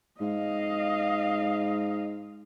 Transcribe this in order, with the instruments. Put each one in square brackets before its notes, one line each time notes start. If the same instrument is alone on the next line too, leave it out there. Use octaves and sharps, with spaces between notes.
[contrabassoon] G#2 [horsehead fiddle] D#5 F5